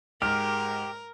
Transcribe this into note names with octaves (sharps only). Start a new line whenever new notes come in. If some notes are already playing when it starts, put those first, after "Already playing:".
G#2 G#3 G4 A#4 F6